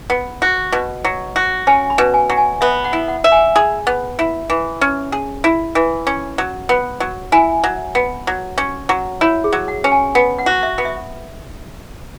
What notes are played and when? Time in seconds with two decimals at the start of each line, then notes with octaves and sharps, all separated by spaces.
0.10 B3
0.42 F#4
0.72 B2
1.04 F#3
1.36 F#4
1.67 C#4 G#5
1.90 B5
1.98 B2
2.14 G#5
2.30 F#3
2.37 G#5
2.61 B3 E5
2.84 F#5
2.93 E4
3.08 F#5
3.24 E5
3.32 G#5
3.56 G#4 B5
3.87 B3
4.19 E4
4.50 E3
4.81 C#4
5.12 G#4
5.44 E4
5.75 E3
6.07 C#4
6.38 F#3
6.69 B3
7.00 F#3
7.32 E4 G#5
7.64 F#3
7.95 B3
8.27 F#3
8.58 C#4
8.89 F#3
9.21 E4 C#5
9.44 G#4
9.53 F#3
9.68 F#5
9.84 C#4
9.92 G#5
10.15 B3
10.39 F#5
10.46 F#4
10.63 E5
10.78 B3
10.85 E5